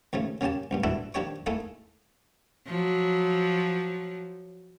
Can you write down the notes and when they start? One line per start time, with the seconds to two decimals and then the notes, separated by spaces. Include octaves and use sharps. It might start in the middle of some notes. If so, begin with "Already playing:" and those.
0.13 D#2 C#3 F3 A3
0.41 C#3 A#3 C#4 G4 A5
0.71 C#2 G2 A#2
0.84 E3 D4 E4 F#4 A4
1.14 D#3 F3 D4 G4 C#5 C#6
1.46 A3 A#3 D#4 E4 G#4 A4
2.67 F3 F#3